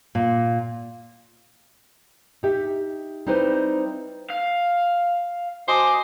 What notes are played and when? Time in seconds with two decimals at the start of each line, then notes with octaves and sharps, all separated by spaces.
0.15 A#2
2.43 D#4 G4 E5
3.27 G3 C4 D#4 E4 B4 C5
4.30 F5
5.68 F#4 C5 D#5 G#5 A5 D6